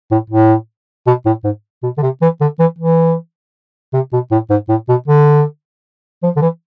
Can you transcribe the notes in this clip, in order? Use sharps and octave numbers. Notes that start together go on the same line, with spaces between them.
A2
A2
B2
A2
G#2
B2
D3
C3
E3
D3
E3
E3
C3
B2
A2
G#2
A2
B2
D3
F3
D3
E3